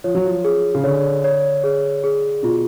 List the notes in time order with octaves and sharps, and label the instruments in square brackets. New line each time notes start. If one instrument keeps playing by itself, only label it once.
[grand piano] F3 [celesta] C#5
[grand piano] F#3
F3
[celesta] G#4
[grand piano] C#3
[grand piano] D3 [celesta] C#5
[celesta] C#5
G#4
G#4
[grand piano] B2 [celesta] F4